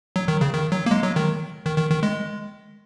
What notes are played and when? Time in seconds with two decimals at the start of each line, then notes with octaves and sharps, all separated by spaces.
0.16 F#3
0.28 D#3
0.41 C#3
0.54 D#3
0.72 F#3
0.86 A#3
0.91 G#3
1.03 F#3
1.16 D#3
1.66 D#3
1.78 D#3
1.91 D#3
2.03 G#3